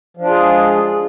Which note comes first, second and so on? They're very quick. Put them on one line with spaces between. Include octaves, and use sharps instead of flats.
F3 D4 F4 G#4 G#3